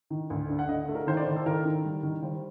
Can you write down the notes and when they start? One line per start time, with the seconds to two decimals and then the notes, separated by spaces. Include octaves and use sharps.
0.10 D#3
0.30 D2
0.50 D3
0.59 F#5
0.69 D3 D#5
0.89 A3
0.95 A#4
1.07 D#3 C5
1.17 D5
1.26 D#3 C5
1.36 A4
1.46 D#3 A#4
1.65 D#3
1.85 G3
2.03 D#3
2.22 G3 C5